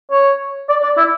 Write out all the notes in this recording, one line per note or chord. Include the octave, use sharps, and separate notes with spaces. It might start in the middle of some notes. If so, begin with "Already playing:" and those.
C#5
D5
D5
E4